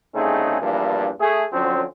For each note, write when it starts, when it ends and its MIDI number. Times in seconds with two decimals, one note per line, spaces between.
0.15 0.60 36
0.15 0.60 49
0.15 0.60 57
0.15 0.60 60
0.15 0.60 63
0.15 0.60 68
0.61 1.10 40
0.61 1.10 43
0.61 1.10 52
0.61 1.10 53
0.61 1.10 58
0.61 1.10 62
1.21 1.45 57
1.21 1.45 68
1.53 1.83 50
1.53 1.83 53
1.53 1.83 54
1.53 1.83 60
1.53 1.83 61